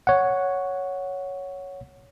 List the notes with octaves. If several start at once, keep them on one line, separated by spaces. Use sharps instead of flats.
C#5 F#5